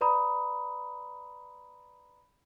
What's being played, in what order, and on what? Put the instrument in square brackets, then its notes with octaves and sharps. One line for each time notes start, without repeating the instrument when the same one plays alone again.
[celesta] B4 D5 A#5 B5 D#6